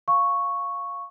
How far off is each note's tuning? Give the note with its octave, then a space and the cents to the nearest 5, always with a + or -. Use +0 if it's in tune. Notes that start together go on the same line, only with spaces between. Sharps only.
F5 +0 C#6 +0